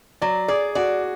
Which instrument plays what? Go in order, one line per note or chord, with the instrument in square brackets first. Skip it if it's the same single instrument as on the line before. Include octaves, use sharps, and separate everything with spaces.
[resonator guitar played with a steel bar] F#3 [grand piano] D5
[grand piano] G#4 [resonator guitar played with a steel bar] D5
[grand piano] F#4 [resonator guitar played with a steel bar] D5